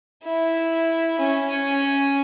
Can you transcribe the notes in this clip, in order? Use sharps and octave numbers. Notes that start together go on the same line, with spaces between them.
E4
C#4